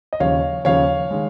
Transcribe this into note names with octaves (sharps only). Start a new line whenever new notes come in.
D#5
D#2 C#3 F3 C#5 F5
D#2 C#3 F3 C#5 F5
D#3 G#3